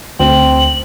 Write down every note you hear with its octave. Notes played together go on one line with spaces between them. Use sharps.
D2 C4 F#7